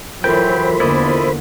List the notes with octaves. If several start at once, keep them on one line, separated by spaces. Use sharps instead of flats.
E3 F#3 F4 A4 A#4 C5 G5 B5
E2 D3 A#3 E4 D5 D#5